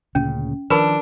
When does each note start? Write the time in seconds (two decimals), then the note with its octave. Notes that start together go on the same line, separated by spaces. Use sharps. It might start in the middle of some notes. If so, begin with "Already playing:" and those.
0.15 D2 A#2 C#3 C#4
0.70 D#3 F3 D4 A#4 B4 A5 B5